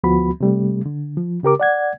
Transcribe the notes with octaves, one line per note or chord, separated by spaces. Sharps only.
D2 F3 B3 F#4 B5
C3 G3 A3
D3
F3
C#3 G4 A#4 D6
D5 F#5 G#6